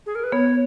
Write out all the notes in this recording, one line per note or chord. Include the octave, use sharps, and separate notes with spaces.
G#4
A#4
B4
B3 C#5